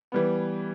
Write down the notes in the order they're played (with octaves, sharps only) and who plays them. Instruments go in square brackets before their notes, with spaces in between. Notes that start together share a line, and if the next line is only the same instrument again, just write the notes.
[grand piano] E3 G3 B3